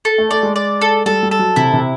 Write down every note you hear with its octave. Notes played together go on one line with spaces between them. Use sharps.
A4
A3
A3 D5
G#3
D5
A4
G3 A4
G3
A4
F#3
C3 E4
C3